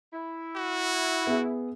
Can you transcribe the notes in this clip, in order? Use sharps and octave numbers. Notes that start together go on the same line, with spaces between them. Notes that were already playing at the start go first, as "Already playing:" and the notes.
E4
F#4
B3 G#4 E5